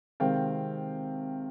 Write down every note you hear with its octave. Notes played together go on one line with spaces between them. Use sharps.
C3 D#3 G#3 C4 F5 G5